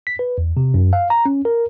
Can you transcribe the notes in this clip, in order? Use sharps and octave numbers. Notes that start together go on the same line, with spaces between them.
B6
B4
E2
C3
F#2
F5
A#5
C#4
A#4